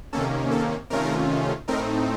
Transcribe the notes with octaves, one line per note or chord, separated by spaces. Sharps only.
C3 D#3 A#3 C#4 A4
A4
C3 D#3 A3 C#4 F4 A#4
A2 A3 C4 D#4 A#4